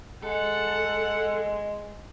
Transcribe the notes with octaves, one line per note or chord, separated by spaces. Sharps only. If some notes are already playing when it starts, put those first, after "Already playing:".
G#3 A4 F#5